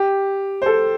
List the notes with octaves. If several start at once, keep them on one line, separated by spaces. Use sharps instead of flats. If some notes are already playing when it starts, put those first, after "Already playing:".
Already playing: G4
C5
A4